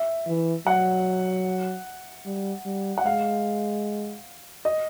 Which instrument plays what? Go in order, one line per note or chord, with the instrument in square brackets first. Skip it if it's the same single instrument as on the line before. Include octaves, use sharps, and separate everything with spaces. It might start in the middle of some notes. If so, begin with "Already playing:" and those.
Already playing: [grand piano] E5
[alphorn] E3
[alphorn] F#3 [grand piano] F#5
[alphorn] G3
G3
[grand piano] F#5
[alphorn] G#3 [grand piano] F5
[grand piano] D#5